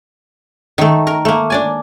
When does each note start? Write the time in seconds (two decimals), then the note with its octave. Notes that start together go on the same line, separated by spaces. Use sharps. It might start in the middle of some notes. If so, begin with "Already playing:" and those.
0.78 D#3 A3
1.07 A#4
1.25 A3 A#3
1.50 D4 D5 G#5